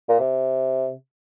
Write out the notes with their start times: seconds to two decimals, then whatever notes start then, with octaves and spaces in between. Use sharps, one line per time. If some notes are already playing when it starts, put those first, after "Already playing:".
0.09 A#2
0.20 C3